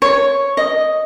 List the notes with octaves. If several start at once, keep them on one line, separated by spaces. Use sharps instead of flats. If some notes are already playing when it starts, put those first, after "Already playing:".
C#5
D#5